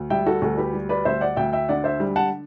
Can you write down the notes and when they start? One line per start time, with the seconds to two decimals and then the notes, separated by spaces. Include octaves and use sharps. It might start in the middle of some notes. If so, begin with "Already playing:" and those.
Already playing: D2
0.10 G3 E5 G5
0.26 F#4 A4
0.42 D2 F#4 A4
0.57 G4 B4
0.73 G3
0.89 B4 D5
1.05 D2 C5 E5
1.21 D5 F#5
1.36 D2 E5 G5
1.53 E5 G5
1.69 D3 D5 F#5
1.84 C5 E5
2.00 G3
2.16 F#5 A5